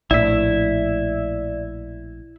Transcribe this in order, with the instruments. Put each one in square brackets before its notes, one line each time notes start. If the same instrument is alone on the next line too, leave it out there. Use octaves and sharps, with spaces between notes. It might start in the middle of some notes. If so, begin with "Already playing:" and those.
[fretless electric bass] A#1 A2 [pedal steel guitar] E4 E5 [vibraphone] D5